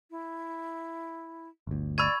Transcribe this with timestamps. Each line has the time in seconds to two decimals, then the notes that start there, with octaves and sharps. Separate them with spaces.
0.11 E4
1.67 G1 D2
1.98 D5 B5 C#6 E6 G#6 D#7